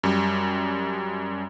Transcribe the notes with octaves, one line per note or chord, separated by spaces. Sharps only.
F#2 G3